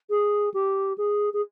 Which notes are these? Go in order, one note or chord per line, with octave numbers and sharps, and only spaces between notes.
G#4
G4
G#4
G#4